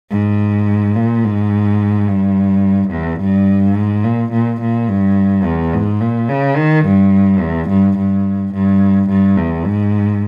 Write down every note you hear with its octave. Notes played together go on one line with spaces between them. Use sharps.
G#2
A#2
G#2
G2
E2
G2
G#2
A#2
A#2
A#2
G2
E2
G#2
A#2
C#3
D#3
G2
E2
G2
G2
G2
G2
E2
G#2